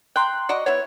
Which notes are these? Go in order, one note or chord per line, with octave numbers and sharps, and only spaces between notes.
G5 A#5 C6 F#6
F#4 D5 D#5
B3 E4 C#5